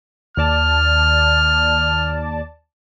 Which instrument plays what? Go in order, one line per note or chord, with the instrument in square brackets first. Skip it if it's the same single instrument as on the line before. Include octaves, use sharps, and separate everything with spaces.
[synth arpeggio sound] D#2 D5 A5 [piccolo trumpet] F6